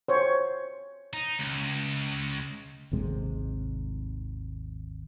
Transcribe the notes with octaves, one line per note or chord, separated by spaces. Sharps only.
C5 C#5
D#4
C#2
G#1 D#2 C3 G#3